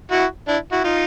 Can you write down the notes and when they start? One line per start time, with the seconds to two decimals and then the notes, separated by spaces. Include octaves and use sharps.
0.12 E4 F#4
0.48 D4 E4
0.72 E4 F#4
0.84 D#4 F4